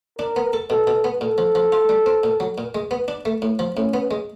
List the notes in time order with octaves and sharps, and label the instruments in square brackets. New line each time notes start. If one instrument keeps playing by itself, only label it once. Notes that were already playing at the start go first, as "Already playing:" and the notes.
[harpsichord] D4 [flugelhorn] A#4
[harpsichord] B3
A4
[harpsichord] B2 [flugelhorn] A4
[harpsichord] B2
B3
[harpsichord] A#2 [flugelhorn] A4
[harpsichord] F3
F3
F4
G3
C4
A#2
F#3
A#2
G#3
B3
D4
A3
A2
F3
[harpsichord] A2 [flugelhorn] C#4
[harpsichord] B3
G#3